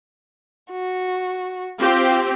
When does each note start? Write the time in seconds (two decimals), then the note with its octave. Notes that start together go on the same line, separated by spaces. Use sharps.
0.72 F#4
1.80 C4 F4 G4